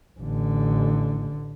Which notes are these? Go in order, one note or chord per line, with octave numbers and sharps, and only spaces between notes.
A1 D3